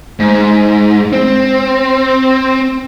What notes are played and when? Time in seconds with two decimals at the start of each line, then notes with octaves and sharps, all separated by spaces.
0.20 G#2
1.13 C4